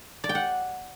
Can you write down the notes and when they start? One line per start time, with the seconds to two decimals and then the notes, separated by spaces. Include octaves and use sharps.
0.24 D5
0.29 G5
0.35 F#5